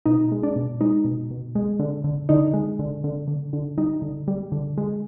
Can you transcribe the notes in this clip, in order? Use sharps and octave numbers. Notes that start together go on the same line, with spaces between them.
B2 D#4
G#3
D4
B2
G#3 D#4
B2
B2
G#3
D3
D3
D3 D#4
G#3
D3
D3
D3
D3
G3 D#4
D3
G3
D3
G#3